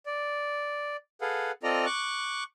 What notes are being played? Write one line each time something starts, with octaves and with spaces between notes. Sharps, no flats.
D5
G#4 A4 B4 F5 F#5
C4 F4 A4 D5 D#5 A#5
C#6 D6 F#6